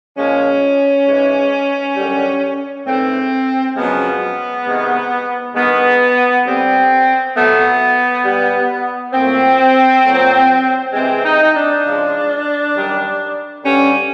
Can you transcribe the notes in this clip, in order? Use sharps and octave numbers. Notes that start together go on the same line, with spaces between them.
A#2 F3 G#3 C#4
G#2 E3 G#3
F#2 D3 G3
G#2 E3 A3 C4
F#2 C#3 F3 G#3 B3
C3 D#3 G#3
G2 D#3 G#3 B3
G2 D3 G3 C4
B2 F#3 A3 B3
B2 G3
A#2 F#3 A3 C4
A#2 F#3 A3
C3 E3 G#3 C4
D#4
D4
C#3 F3 G#3
F#2 D#3 G3
G2 D3 G3 C#4